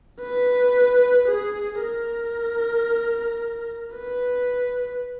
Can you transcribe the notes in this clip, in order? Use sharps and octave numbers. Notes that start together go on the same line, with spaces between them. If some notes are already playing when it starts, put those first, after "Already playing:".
B4
G#4
A#4
B4